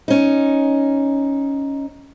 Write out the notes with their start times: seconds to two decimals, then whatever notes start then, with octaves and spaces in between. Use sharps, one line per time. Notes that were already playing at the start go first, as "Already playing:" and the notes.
0.08 C#4 D#4